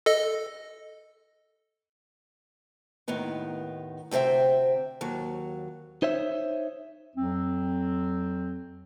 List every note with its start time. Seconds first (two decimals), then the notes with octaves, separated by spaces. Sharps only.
0.06 A4 D#5
3.08 D#2 A2 D#3 B3 D#4
4.11 D2 C3 C5 E5 G5
5.01 D#2 F#3
6.02 D#4 C5 C#5 E5
7.15 F2 F#3 C4